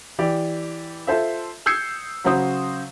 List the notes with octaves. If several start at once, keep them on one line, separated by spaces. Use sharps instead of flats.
E3 G4 D5
F4 A4 C5 E5
D#6 E6 G6 G#6 C7 C#7
C#3 F#3 F#4 C5 D#6